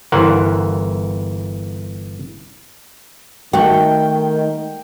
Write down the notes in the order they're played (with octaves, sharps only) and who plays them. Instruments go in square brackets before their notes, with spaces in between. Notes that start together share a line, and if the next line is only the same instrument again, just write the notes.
[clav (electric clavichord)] G1 E3 A#4 C5 F5 F#5
[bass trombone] D#3 [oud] A3 F#4 [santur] G5